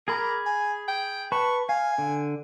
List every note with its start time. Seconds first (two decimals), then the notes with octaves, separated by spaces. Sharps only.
0.08 G#4 A#4 B5 D6
0.46 G#5
0.88 G5
1.32 B4 A5 B5 C#6
1.69 F5 G#5
1.98 D3